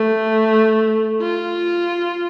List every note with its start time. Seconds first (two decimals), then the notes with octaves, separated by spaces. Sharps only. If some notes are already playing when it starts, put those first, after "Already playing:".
Already playing: A3
1.21 F4